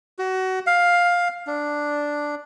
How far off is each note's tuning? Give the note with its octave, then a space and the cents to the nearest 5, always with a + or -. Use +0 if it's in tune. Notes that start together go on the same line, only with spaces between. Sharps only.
F#4 +25
F5 +10
D4 +0